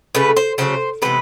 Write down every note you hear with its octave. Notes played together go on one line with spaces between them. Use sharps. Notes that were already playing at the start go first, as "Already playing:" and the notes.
C#3 F#3 A3 B4
C5
C#3 F#3 A3 C5
C3 E3 G#3 B3 B4